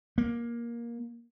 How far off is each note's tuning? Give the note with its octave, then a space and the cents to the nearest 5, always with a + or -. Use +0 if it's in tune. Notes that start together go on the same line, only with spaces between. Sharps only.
A#3 +15